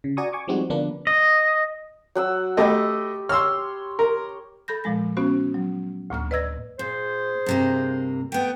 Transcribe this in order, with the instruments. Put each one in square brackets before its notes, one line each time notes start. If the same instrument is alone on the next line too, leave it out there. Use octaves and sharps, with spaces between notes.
[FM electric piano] C#3
F#4 D5 G#5 A#5 C#6 D#6
G#5 C#6 D6
F3 G3 G#3 C4 D#4 F#4
D3 F3 A#3 B3 D4 B4
[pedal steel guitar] D#5
[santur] F#3 F#5 E6
[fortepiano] A3 D#5 [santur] G4 B5 E6
[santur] C#5 C6 [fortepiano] E6 F6
[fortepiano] A#4
[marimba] A4 B5 G6 A#6
A#2 F3 G#3 A#6
B3 C#4 F#4 C5
F#3
D2 A2 A#3 F6
B4 D5 D#5 E6 G#6 A#6
[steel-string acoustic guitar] A#2 [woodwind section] G#4 C5
[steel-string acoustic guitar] G2 C3 A#3
[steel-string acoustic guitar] A3 B3 [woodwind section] G5